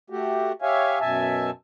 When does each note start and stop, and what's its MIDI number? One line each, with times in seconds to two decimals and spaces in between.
0.10 0.52 57
0.10 0.52 66
0.10 0.52 67
0.62 0.99 67
0.62 0.99 73
0.62 0.99 76
0.62 0.99 77
0.62 0.99 80
1.00 1.50 42
1.00 1.50 47
1.00 1.50 76
1.00 1.50 80
1.00 1.50 81